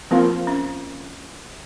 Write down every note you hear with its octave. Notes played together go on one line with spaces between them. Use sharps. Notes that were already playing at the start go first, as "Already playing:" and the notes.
F3 A#3 C4 F4
C#4